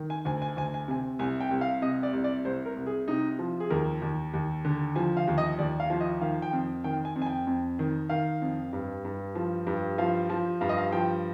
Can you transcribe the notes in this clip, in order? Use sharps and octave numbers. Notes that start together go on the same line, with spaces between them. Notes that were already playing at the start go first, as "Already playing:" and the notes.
Already playing: D#3
G#5
D2 G#5
G#5
D2 G#5
G#5
C3 G#5
C2 G#5
G5
C2
F5
C3 D#5
D5
C2
D5
C2 C5
A#4
C2
G#4
C3 D#4
F3
G#4
D#2 A#4
D#2
D#2
D3
F3 G#5
F5
D#2
D#5
D#2 D5
F5
F3
D#5
D#3 F5
G5
F2
D#3 G5
G#5
F2
G#5
G5
F2
D#3
D#3 F5
F2
G2
G2
F3
G2
F3 F5
F3
G2 F5
D#5
F5
F3 G5